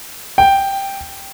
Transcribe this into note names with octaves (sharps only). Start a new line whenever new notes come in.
G5